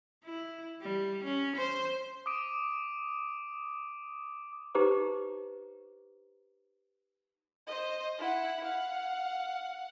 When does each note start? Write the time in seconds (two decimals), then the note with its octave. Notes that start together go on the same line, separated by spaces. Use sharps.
0.25 E4
0.82 G3
1.24 C#4
1.57 C5
2.26 D6 D#6 D7 D#7
4.75 D#4 G4 B4 C5 A#5 D6
7.67 C5 D#5
8.18 E4 F#5
8.65 F5 F#5